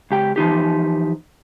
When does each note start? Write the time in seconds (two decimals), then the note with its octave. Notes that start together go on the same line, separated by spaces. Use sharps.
0.11 C#2 G4 G5
0.36 E3 F3 D#4 G4